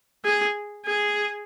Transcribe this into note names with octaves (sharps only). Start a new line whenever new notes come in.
G#4
G#4